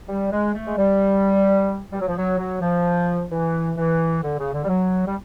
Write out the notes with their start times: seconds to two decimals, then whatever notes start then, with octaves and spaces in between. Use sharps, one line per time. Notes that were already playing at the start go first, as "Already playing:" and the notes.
0.08 G3
0.31 G#3
0.54 A3
0.66 G#3
0.77 G3
1.92 G3
2.00 F#3
2.08 F3
2.16 F#3
2.38 F#3
2.61 F3
3.30 E3
3.77 E3
4.22 D3
4.38 C#3
4.53 D3
4.64 G3
4.68 F#3
5.06 G3